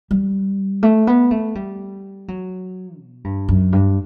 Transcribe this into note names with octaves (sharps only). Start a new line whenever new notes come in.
G3
A3
B3
A3
G3
F#3
B2
G2
F#2
G2